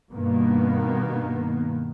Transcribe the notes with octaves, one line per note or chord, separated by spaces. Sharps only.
G2 B2 D#3 A#3 B3